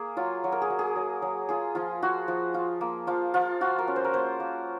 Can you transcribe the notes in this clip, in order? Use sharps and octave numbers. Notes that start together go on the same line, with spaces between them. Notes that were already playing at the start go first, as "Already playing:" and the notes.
Already playing: A#3 G#4
F#3 F4
F#3
A#4
G#4
F#3
G#4
F#3
F#3
F4 G#4
F3 F4
F4 F#4
F3
F4
A#3
F3 F4
F3 F4
F4 F#4
A#4
C#4
C5
A#4
A#3 C5
A#3